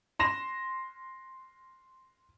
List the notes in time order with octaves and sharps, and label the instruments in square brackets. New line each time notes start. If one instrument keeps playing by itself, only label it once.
[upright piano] C6 A#6 E7